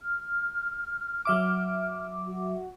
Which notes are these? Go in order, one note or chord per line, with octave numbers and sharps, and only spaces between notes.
F6
F#3 E5 D6
F#4